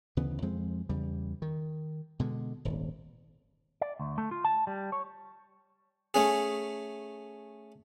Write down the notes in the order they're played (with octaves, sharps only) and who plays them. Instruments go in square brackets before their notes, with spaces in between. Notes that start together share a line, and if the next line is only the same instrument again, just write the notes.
[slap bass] D2 C#3 E3 B3
F2 F3 G#3 C4
E2 C#3 G3
D#3
B2 D3 G#3
D#1 G#1
[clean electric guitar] D5
D2
A3
F4
A5
G3
C#5
[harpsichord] A3 C#4 G#4